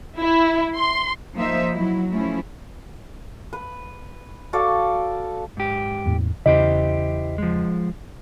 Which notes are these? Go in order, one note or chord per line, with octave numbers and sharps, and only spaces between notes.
E4
C6
F3 A#3 D#4 C5 E5
F#3 E4
F3 A3 C#4 E4
B4
F#4 A4 D5 F5
G#2 G4
E1 E2 A2
E2 C#3 E4 G4 C5 D#5
F3 G#3